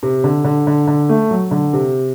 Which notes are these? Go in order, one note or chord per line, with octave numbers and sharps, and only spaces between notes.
C3
D3
D3
D3
D3
A3
F#3
D3
C3